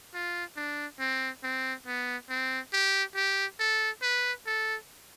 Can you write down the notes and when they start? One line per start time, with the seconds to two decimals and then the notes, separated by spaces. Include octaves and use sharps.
0.14 F4
0.56 D4
1.00 C4
1.43 C4
1.86 B3
2.29 C4
2.73 G4
3.15 G4
3.60 A4
4.02 B4
4.46 A4